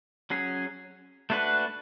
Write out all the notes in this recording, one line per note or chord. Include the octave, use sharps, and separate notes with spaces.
F#3 C#4 G#4
A3 D4 F#4 B4